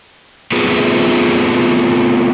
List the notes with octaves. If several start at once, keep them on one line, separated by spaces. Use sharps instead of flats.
A3 B3 C4 F4 G#4 B4